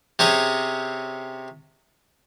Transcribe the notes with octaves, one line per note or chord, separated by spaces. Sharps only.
C3 C4 C#4 G#4